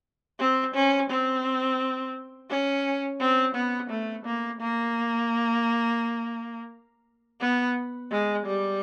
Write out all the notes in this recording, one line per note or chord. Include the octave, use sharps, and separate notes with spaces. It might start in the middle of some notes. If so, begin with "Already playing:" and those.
C4
C#4
C4
C#4
C4
B3
A3
A#3
A#3
B3
G#3
G3